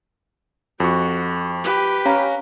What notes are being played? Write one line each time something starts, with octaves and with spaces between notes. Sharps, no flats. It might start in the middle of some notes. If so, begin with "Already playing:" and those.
F2 F#4 C#6
G4 B4
C#4 F5 A#5